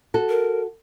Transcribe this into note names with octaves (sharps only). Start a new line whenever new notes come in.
F#4 A4
A#4